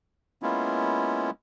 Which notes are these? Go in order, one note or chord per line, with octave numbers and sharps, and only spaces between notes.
G#3 A#3 B3 C#4 E4 F4